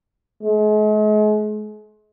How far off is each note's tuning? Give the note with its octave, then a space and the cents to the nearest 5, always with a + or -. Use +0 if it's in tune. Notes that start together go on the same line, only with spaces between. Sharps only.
G#3 +40